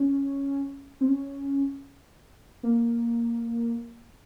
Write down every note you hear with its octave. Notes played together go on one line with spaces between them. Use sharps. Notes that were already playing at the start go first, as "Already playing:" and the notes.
Already playing: C#4
C4
C#4
A#3